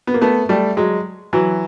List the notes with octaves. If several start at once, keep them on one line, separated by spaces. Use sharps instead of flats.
B3
A#3
A3 B3
G3 A3
F#3 G#3
E3 F#3